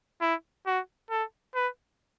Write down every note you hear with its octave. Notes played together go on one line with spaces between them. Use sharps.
E4
F#4
A4
B4